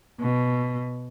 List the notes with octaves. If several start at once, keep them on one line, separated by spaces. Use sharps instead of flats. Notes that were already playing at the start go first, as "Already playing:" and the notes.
B2